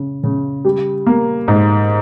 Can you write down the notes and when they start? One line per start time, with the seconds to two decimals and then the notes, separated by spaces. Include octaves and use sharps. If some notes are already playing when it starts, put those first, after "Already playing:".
Already playing: C#3
0.24 C#3
0.65 G3
1.06 A#3
1.48 G#2